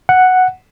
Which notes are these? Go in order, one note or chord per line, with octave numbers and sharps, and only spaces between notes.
F#5